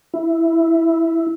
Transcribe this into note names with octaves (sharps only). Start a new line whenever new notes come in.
E4